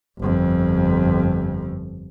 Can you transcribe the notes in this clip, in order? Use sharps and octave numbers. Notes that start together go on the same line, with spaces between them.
G1 F2